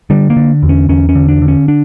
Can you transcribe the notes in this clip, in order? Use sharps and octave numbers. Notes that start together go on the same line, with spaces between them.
D3 G3
A#3
D3
E2
C#4
E2 C#4
C#4
D3
D4
D3
C#4
D4